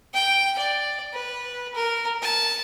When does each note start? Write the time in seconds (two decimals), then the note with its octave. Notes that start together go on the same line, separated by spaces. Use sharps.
0.14 G5
0.58 D5
1.13 B4
1.74 A#4
2.22 A5